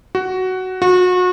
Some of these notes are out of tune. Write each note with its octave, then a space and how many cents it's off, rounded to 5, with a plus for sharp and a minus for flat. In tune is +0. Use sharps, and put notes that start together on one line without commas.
F#4 +10
F#4 -30